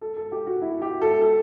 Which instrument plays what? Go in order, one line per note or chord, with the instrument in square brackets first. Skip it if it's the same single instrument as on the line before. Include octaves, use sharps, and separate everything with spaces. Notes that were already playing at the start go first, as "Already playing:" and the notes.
[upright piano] A4
A4
G4
F#4
E4
G4
A4
A4